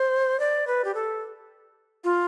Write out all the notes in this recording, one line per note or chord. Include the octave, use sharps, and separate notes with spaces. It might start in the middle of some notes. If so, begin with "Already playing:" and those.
Already playing: C5
D5
B4
G4
A4
F4